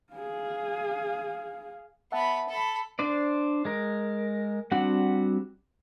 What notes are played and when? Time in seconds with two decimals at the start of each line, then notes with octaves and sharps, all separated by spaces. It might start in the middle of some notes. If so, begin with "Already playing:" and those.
0.13 G#4 F5
2.12 B3 E5 F#5 A5 B5
2.49 A4 B5
2.99 D4 C5 D5
3.65 G#3 A#4
4.72 G3 C4 D4 F#4 F#5